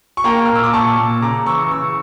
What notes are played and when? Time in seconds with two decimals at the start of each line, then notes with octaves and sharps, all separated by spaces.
0.17 C#6
0.24 A#3 G5 A#5
0.46 A#2 F6
0.56 E6
0.64 D6
0.73 A#2 A5 C#6
0.98 A#2
1.22 C#3 A#5 D6
1.46 E3 C#6 E6
1.71 C#3 C#6 E6